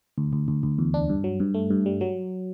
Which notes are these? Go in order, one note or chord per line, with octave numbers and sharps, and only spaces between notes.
D2
D2
D2
D2
E2
D4
G2
F#3
G2
A3
G2
G3
F#3